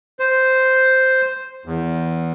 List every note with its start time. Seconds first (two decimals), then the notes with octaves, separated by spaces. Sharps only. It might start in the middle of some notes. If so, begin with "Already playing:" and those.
0.20 C5
1.66 E2